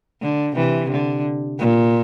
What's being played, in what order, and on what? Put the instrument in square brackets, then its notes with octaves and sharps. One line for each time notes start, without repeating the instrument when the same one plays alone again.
[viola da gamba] D3
C3 E3
D3
A#2